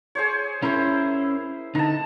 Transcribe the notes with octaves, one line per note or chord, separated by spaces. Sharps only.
G#4 C5 C#5
C#4 E4 A#4 C5
D3 D#4 A5 A#5